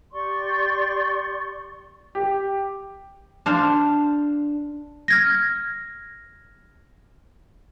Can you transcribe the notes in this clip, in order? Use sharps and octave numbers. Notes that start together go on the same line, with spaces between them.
G4 D5 C6 C#6
G4
D4 C5 F5
F6 G#6 A#6